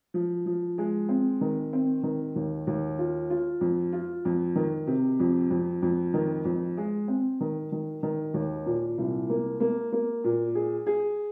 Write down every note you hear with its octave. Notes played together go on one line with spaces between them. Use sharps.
F3
F3
G#3
C4
D#3
C4
D#3
D#2
D#2
F4
F4
F2
F4
F2
D#3
C3
F2
F2
F2
D#3
F2
G#3
C4
D#3
D#3
D#3
D#2
A#2
C2
A#3
A#3
A#3
A#2
G#4
G#4